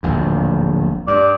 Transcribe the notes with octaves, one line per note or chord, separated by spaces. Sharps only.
D1 A#1 D#2
G2 D5